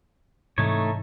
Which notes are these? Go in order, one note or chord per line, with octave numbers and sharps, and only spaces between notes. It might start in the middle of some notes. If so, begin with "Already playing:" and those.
G#2 C3 E3 A3 D#4 C#5